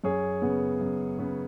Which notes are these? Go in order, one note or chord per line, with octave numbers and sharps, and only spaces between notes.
F#2 G#4 C#5
C#3 B3
F#2
C#3 B3